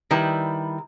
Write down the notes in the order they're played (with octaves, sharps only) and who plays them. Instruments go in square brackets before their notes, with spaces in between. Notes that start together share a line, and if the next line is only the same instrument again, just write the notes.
[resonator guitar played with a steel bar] D#3 G3 E4 B4